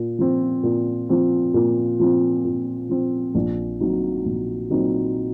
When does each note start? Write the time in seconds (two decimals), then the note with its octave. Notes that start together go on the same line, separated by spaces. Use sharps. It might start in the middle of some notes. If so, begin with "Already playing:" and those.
Already playing: A#2
0.19 F3 C4
0.63 A#2
1.09 F3 C4
1.54 A#2
2.00 F3 C4
2.45 A#2
2.89 F3 C4
3.35 A#1
3.80 A#2 F#3 C4 D#4
4.25 A#1
4.70 A#2 F#3 C4 D#4